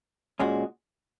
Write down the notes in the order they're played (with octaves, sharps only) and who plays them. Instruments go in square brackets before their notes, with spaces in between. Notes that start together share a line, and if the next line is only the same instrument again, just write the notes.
[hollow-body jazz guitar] A#2 G#3 C#4 F#4